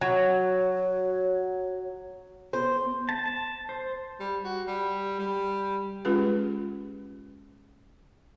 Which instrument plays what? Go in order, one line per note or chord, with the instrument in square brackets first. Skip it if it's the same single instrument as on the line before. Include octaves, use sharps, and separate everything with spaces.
[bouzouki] F#3 [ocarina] C#5
[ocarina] B3 [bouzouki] C5
[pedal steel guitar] A5
A5
C5
[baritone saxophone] G3
F#4
G3
G3
[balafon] G#3 C#4 F4 G4 G#4 B4